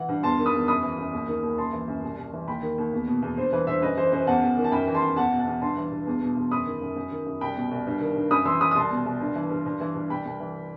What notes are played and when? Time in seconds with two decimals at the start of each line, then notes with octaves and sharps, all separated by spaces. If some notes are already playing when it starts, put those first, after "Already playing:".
Already playing: E3 F#5
0.09 G2
0.23 E2 A5 C6
0.38 D#3
0.46 B5 D#6
0.53 E2
0.68 F#2 B5 D#6
0.83 E3
0.98 F#2
1.13 D#2
1.28 D#3
1.43 D#2
1.58 F#2 A5 C6
1.73 E3
1.88 F#2
2.03 C2
2.18 C2
2.33 E3
2.47 D#2 G5 B5
2.62 D#3
2.78 D#2
2.93 E2
3.08 B2
3.22 E2
3.38 G2 C5
3.53 E3 B4
3.67 G2 C5 E5
3.82 F#2 B4 D#5
3.97 E3 C5
4.12 F#2 C5
4.27 E2 F#5 A5
4.42 E2
4.57 D#3
4.64 A5
4.72 F#2 G5 B5
4.87 E3
4.94 A5 C6
5.02 F#2
5.16 E2 F#5 A5
5.31 B2
5.39 F#5 A5
5.47 E2
5.62 G2 A5 C6
5.77 E3
5.91 G2
6.07 E2
6.21 B2
6.37 E2
6.51 F#2 B5 D#6
6.66 D#3
6.82 F#2
6.96 F#2
7.11 D#3
7.26 F#2
7.41 C2 G5 B5
7.56 B2
7.71 C2
7.87 G2
8.01 D#3
8.16 G2
8.31 F#2 B5 D#6
8.45 E3 C6 E6
8.61 F#2 B5 D#6
8.71 D#6
8.75 C2 A5 C6
8.90 B2
9.06 C2
9.21 G2
9.36 E3
9.50 G2
9.66 G2
9.80 E3
9.95 G2
10.10 C2 G5 B5
10.25 C2
10.40 E3